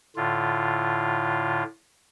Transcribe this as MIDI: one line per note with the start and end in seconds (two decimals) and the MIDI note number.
0.16 1.63 45
0.16 1.63 50
0.16 1.63 65